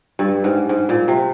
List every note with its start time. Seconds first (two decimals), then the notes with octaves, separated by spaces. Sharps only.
0.19 G2
0.44 G#2
0.69 G#2
0.89 A#2
1.08 C3